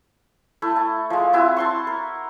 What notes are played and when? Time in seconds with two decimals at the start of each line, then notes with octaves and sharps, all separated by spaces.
0.62 A3 E4
0.76 A5
1.10 F3 G#3
1.33 C4 E4 F#4 G#5
1.57 A5 C6 C#6
1.87 A#4